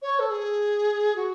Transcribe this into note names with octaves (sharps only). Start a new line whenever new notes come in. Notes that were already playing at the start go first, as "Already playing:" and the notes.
C#5
A4
G#4
F#4